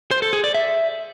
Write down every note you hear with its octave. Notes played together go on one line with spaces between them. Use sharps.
C5
A4
G#4
D5
E5